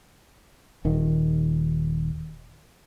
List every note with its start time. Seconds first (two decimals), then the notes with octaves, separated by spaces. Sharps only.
0.85 D#1 D#3